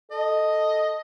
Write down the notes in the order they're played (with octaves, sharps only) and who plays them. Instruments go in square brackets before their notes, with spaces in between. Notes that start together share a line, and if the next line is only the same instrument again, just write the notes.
[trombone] A4 [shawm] D#5